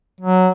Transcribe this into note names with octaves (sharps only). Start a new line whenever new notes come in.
F#3